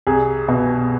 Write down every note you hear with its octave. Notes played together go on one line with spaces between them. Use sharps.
C2 G#4
B2